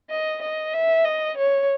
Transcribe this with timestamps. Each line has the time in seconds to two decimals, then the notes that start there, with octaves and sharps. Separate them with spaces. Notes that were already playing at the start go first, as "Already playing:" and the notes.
0.10 D#5
0.41 D#5
0.73 E5
1.05 D#5
1.37 C#5